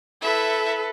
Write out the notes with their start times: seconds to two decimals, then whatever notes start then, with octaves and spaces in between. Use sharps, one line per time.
0.21 E4 A4 B4 E5